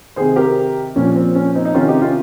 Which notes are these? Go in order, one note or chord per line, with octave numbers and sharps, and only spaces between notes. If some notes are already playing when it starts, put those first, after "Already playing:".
C3 D#3 G#4 C5
G4 A#4
A#2 F3 C#4
C4
C#4
C4 D#4
D#4
C3 D#3 C#4 F4
D#4 G4
C#4 F4